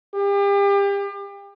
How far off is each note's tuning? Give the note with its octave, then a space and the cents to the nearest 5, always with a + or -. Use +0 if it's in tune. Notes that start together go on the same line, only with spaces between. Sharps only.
G4 +35